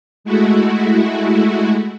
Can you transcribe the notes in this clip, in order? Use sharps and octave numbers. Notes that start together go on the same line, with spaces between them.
G#3 A3 E4 F#4